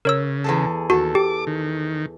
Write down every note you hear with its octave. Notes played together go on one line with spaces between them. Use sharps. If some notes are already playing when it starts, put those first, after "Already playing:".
C#3 A#4 C#5 E6
E2 G#4 A4
D#2 F#4 A4
G4 D6
D#3